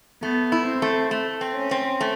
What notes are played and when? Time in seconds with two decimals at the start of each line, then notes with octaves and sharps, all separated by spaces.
0.22 A3 B3
0.52 E4
0.67 C4
0.82 A3
1.11 A3
1.41 C4
1.55 C#4
1.71 C4
2.01 A3